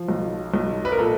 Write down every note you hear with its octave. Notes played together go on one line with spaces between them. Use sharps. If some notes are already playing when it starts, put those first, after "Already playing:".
Already playing: F3
B1
B1
B4
A#4
A#2 A4